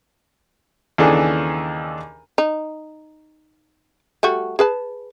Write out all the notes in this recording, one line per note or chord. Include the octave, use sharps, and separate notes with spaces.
D#2 C#3 E3 D4 G#4 A4
D#4
G3 A3 F#4
G#4 B4 A5